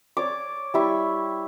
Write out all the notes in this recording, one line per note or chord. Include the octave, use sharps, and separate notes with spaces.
C#5 D5 D6
G3 E4 C#6